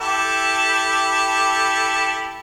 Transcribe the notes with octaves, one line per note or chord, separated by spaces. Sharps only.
E4 G4 A4